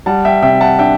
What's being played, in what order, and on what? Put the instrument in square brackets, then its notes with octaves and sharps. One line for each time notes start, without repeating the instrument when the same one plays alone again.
[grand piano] G3 F#5 A5
E5 G5
C3 E5 G5
F#5 A5
D4 E5 G5